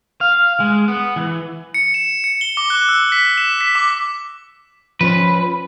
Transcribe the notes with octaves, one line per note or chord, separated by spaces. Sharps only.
F5
G#3
B3
E3
C#7
E7
C#7
G7
D6
F#6
E6
B6
E7
B6
D6
F3 C#4 B4 C5